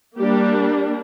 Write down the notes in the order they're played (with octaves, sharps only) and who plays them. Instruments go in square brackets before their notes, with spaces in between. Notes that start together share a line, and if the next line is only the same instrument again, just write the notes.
[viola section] G3 A#3 D4 G4